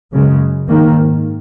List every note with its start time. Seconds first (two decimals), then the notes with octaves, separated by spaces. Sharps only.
0.12 F#2 C#3 G#3
0.68 G#2 D#3 A#3